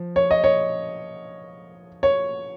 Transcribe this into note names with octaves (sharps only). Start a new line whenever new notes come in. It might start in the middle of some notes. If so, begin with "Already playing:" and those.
Already playing: F3
C#5
D#5
C#5
C#5